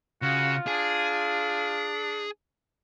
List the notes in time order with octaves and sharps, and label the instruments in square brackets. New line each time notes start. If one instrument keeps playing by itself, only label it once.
[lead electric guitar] C#3 [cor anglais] F4 [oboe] F#4
[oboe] D4 [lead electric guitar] G#4